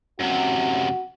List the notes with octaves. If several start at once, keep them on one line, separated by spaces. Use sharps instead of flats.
F#2 C3 F#4